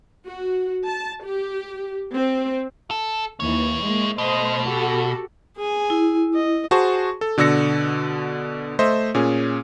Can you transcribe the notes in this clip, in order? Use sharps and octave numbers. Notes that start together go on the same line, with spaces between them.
F#4
A5
G4
C4
A4
D#2 E3 E4 C#5
G#3 A#3
B2 A3 C5 D#5
F#4 G4 A4
G#4 G#5
E4
D#5
F#4 G#4 C5 A5 C#6
A4
B2 D3 D5 E6 A#6 C#7
A3 C5 D#5 E5
A#2 C#4 G#4